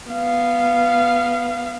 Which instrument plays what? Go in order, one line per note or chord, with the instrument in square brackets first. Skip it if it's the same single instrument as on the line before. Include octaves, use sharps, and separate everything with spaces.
[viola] B3 F5